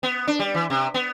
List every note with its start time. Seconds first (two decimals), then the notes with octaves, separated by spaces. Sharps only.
0.03 B3
0.27 D4
0.39 G3
0.55 E3
0.70 C3
0.94 B3